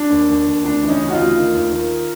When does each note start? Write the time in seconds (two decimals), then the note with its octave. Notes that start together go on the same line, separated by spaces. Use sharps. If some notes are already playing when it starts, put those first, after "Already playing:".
Already playing: D4
0.10 D#2
0.28 D#2
0.46 D#2
0.64 D2 D4
0.82 E3
0.88 C#4 D#4
1.01 C#3
1.09 F#4
1.12 D#4 F4
1.18 D2
1.37 D#3
1.55 D#2
1.72 D#3